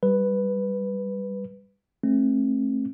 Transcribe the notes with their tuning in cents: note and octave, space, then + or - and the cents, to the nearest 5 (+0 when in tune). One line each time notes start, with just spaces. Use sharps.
G3 +0 B4 +0
A3 +0 C4 +40